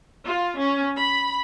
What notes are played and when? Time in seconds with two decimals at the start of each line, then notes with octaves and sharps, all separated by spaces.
0.23 F4
0.55 C#4
0.98 B5